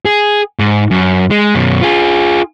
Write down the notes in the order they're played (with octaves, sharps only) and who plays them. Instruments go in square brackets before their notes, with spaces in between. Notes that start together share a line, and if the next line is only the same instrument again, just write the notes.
[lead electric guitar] G#4
G#2
F#2
G#3
F#2 B2
F4 G#4